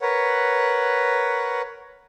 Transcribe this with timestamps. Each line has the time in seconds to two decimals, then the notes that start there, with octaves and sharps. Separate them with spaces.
0.01 A#4 B4 C#5 F#5